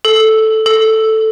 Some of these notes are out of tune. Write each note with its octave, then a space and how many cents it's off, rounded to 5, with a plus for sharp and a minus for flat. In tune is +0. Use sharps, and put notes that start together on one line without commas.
A4 -5
A4 +0